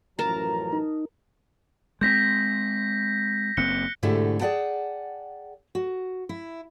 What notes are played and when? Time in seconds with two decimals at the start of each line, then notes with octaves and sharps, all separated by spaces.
0.19 A1 F#2 F3 A#4 A5 A#5
0.72 D#4
2.01 G#3 A#3 C4 G6 A#6 B6
3.57 F#1 A#3 C4 F#6 C#7 G7
4.03 G#2 B2 D3 A3 E4 G4
4.40 G#4 D5 D#5 F#5 G5 A5
5.75 F#4
6.29 E4